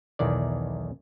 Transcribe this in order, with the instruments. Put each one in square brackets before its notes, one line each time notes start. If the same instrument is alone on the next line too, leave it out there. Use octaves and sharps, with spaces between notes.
[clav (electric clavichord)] B1 E2 D#3 D5